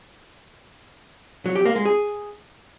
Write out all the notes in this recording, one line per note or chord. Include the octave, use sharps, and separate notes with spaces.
F#3
G4
A#3
G#3
G#4